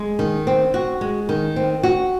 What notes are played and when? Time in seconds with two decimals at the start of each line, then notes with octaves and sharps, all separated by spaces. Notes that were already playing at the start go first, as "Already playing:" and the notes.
Already playing: G#3
0.19 D#3
0.47 C4
0.74 F#4
1.01 G#3
1.29 D#3
1.56 C4
1.83 F#4